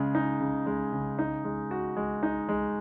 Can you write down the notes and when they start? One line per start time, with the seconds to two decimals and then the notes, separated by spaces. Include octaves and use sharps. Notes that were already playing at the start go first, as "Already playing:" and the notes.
Already playing: C#3 G#3
0.15 D#4
0.40 C#3
0.66 G#3
0.93 C#3
1.19 D#4
1.44 G#3
1.71 F#4
1.97 G#3
2.23 D#4
2.49 G#3